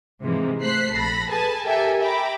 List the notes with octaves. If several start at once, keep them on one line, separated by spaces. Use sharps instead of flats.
G#2 C3 E3 G#3 A#3
A3 C5 F#6 B6 C7
A#1 A4 B5 A#6
G#4 A4 B4 G#5 A5
G4 A4 A#4 E5 G5 G#5
E5 G5 A#5 B5 D6